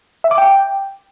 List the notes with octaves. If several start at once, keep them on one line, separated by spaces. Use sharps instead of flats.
E5
D6
G5